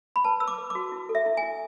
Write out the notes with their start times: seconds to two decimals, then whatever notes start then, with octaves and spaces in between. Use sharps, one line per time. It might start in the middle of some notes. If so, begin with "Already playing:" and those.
0.16 B5
0.24 B4 A5
0.40 B4 E6
0.48 D6
0.58 B4
0.70 D6
0.75 F#4
0.92 E4
1.09 A4
1.15 E5
1.26 E4
1.37 G#5
1.43 E4